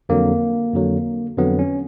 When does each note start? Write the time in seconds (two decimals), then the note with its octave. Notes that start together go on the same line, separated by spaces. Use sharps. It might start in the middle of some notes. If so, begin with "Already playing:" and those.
0.09 F2 D3 F#3 A#3
0.74 F2 D3 F#3
1.38 F2 D3 F#3 B3
1.59 C#4